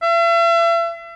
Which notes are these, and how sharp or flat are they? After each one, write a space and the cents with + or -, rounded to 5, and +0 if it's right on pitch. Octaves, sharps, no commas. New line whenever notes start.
E5 +40